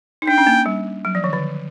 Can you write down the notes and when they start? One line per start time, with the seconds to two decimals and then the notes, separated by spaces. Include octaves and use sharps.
0.22 D#4
0.27 D4 G5
0.38 C#4
0.47 A#3
0.66 G3
1.05 F#3
1.15 F3
1.24 D#3
1.33 D3